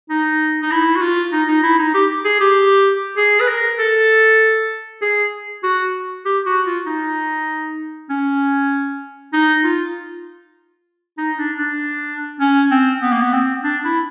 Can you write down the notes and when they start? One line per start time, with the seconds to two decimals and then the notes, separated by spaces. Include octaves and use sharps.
0.10 D#4
0.62 D#4
0.71 E4
0.96 F#4
1.02 F4
1.32 D#4
1.48 D#4
1.63 E4
1.79 D#4
1.94 G4
2.25 G#4
2.41 G4
3.17 G#4
3.40 B4
3.48 A#4
3.79 A4
5.02 G#4
5.63 F#4
6.25 G4
6.46 F#4
6.66 F4
6.87 D#4
8.10 C#4
9.33 D#4
9.64 F4
11.18 D#4
11.38 D4
11.58 D4
12.40 C#4
12.71 C4
13.02 B3
13.12 A#3
13.22 B3
13.33 C4
13.64 D4
13.85 E4